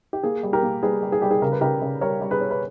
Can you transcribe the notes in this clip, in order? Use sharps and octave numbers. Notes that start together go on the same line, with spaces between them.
G4
A#3 G#4
G3
G4 A#4
A#3
G3 G#4 B4
G3
G#4
G3 G4
G#4
C#3 A#4
B4
C#3 G4 A#4
C#3
G3 A#4 C#5
G3
G#4 B4
C#4
B4